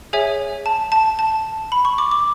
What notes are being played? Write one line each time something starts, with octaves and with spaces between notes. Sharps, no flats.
G#4 C#5 E5 G#5
A5
A5
A5
B5
C#6
D6
D6